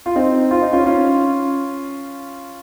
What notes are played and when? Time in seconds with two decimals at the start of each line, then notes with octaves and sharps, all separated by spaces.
0.06 F4
0.16 C4 D#4
0.51 F4
0.62 D#4
0.73 C#4 F4
0.86 C#4 F4